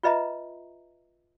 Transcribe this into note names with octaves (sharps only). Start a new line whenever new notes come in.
F4 B4 D#5 E5 A#5